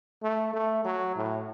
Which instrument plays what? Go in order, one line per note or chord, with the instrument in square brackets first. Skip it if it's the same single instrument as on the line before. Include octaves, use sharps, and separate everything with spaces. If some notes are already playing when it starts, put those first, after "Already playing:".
[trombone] A3
A3
F#3
A2